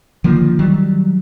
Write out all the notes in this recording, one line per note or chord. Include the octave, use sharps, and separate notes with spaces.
D3 D#3 F3 A#3
D#3 F#3 G3